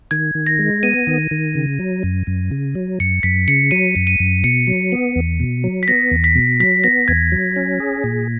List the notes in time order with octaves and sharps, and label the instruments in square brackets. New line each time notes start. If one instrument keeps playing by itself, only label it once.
[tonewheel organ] D#3 [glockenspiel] G#6
[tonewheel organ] D#3
[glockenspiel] A#6
[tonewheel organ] G#3
[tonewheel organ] B3 [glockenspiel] D#7
[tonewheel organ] D#3
D#3
C#3
F#3
F#2
F#2
C#3
F#3
[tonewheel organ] F#2 [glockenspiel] C#7
[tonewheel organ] F#2 [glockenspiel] B6
[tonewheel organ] C#3 [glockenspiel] C#7
[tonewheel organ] F#3 [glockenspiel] D#7
[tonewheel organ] F#2
[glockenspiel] D#7
[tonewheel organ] F#2
[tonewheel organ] B2 [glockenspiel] C#7
[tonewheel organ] F#3
B3
E2
B2
F#3
[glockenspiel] B6
[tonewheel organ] B3 [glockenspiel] A#6
[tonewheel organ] E2
[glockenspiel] B6
[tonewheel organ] B2
[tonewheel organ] F#3 [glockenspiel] B6
[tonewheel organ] B3 [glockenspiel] A#6
[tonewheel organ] E2 [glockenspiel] G#6
[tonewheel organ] F#3
C#4
G#4
A#2